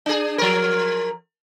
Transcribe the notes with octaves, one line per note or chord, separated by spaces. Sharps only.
D4 G#4
F3 A#4